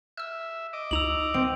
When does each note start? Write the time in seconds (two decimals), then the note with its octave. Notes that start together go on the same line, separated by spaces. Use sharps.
0.17 E5 E6 F6
0.73 D#5 D6
0.91 C#2 D#4 E6 F7 F#7
1.34 C4 D7